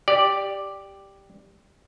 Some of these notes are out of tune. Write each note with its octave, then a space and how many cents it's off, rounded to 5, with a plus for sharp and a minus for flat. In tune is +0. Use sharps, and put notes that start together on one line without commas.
G4 +0 D5 +0